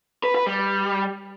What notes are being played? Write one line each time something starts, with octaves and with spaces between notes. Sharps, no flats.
B4
B4
G3